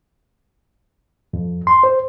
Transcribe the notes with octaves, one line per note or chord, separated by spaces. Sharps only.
F2
C6
C5